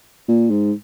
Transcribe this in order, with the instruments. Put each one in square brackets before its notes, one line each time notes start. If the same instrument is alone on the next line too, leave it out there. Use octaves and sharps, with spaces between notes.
[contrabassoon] A#2
G#2